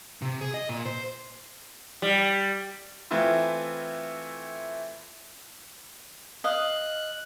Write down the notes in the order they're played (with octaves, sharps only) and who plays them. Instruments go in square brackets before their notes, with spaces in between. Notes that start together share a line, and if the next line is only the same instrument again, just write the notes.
[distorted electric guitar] C3
G#4
D#5
A#2
C5
[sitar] G3
[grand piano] E3 A3 C4 E4 F4
[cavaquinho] D#5 F5 [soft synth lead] F#6